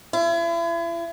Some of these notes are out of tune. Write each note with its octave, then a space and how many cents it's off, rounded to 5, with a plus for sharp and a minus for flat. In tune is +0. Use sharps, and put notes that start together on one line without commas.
E4 +40